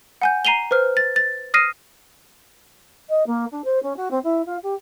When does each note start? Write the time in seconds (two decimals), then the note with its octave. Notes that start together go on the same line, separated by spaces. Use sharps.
0.22 F#5 G#5 G6
0.45 A#5 C7 D#7 F7 G7
0.71 B4 C5 F6
0.97 A6
1.16 A6
1.54 D#6 F6 A#6 C7 D#7
3.09 D#5
3.26 A#3
3.51 D4
3.64 C5
3.83 C#4
3.96 F#4
4.11 C4
4.23 E4
4.46 F4
4.63 G4